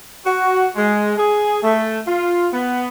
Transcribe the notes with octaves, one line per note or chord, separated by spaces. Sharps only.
F#4
G#3
G#4
A3
F4
B3